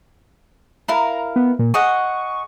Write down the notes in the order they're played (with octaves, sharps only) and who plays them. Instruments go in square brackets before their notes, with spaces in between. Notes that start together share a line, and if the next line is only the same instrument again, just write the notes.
[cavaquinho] E4 A#4 F5 [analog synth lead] A#5
[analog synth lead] B3
A#2
[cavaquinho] G#4 D#5 F#5 [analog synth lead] C#6